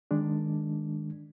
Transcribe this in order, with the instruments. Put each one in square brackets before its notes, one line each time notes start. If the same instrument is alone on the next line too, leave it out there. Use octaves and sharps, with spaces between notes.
[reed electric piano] D#3 G#3 D4